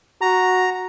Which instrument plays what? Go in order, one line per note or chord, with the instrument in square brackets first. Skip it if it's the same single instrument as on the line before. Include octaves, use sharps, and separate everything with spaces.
[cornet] F#4 [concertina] A#5